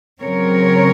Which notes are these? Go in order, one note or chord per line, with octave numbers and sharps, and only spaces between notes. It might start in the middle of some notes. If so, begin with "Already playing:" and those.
C#3 F#3 C4 A#4 C#5